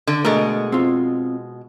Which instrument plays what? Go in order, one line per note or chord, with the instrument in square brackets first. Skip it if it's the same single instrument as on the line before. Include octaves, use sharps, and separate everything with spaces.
[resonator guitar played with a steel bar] D3
[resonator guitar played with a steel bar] B2 G#3 [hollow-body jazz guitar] A3 G#4 A#4
[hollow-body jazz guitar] C4 F4